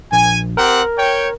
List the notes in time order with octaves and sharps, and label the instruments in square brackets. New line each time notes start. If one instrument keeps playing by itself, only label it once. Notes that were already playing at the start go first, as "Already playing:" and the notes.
[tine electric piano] A#1 [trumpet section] G#5
[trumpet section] C4 G4 F#5 [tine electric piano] A#4
[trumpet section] C#5 G5